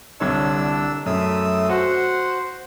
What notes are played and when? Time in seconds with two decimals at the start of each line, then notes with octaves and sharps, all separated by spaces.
0.20 C2 D3 D4 C#5 E6
1.06 F#2 A3 D#6 E6
1.69 F#4 C5 F#5